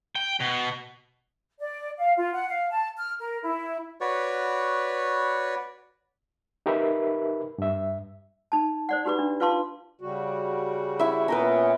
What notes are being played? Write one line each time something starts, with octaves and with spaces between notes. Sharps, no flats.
G5
B2
D5
F5
F4
F#5
F5
A5
F6
A#4
E4
F#4 B4 C#5 D5
D#4 G4 A#4 B4 E5 B5
G2 E5
D#4 A5
C5 D5 F#5
D#4 F#4 G4 B4 B5 D6
D4
F4 B4 F5 A5 C6 D6
C#3 G3 F#4
E4 E5
A#2 B3 C#4 B4 G5 A#5